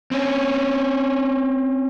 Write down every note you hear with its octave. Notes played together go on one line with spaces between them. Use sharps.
C4 C#4